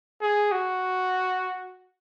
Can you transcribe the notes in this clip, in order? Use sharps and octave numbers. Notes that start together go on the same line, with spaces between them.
G#4
F#4